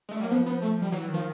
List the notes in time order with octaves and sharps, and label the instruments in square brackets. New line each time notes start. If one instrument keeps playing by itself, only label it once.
[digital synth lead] G#3
[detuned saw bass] A3
[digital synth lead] G3
[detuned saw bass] A#3
[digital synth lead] F#3
[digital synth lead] F3 [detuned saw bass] B3
[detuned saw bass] B3
A3
G3
[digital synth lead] E3 [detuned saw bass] F#3
[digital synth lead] D#3
[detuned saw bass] F3